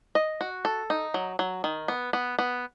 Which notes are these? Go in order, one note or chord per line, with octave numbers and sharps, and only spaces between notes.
D#5
F#4
A4
D#4
F#3
F#3
D#3
B3
B3
B3